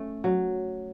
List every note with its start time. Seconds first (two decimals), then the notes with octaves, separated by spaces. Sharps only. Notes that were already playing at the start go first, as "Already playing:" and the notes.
Already playing: A3 C#4
0.24 F#3